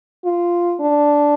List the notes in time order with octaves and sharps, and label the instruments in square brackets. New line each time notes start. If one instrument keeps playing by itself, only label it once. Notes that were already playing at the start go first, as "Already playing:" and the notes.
[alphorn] F4
D4